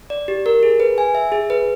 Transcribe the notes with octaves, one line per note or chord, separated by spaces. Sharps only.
D5
G4
A#4
G#4
B4
G#5
E5
G#4
B4